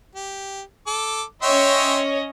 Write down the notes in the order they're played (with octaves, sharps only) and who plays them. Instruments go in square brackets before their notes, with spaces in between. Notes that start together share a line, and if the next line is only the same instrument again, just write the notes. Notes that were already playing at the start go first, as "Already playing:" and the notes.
[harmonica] G4
A4 D6
[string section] C#4 C#5 D#5 [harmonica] E5 G5 C6